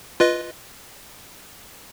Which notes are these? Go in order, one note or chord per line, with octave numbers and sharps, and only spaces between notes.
F4 B4 D#5